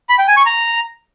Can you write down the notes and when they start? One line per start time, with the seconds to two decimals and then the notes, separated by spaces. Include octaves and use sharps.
0.09 B5
0.18 G5
0.28 G#5
0.37 C#6
0.46 A#5